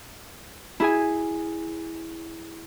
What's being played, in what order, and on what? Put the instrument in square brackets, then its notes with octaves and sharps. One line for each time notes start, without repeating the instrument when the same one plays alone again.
[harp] E4 G#4 G#5